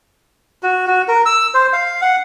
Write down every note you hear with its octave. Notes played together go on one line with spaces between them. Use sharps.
F#4
F#4
A#4
E6
C5
F5
F#5